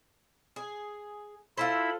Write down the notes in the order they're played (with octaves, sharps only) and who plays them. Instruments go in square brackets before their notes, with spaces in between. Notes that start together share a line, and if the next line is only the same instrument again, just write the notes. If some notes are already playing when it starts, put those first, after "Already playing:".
[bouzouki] G#4
[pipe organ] E4 B5 [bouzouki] F4 A4 C5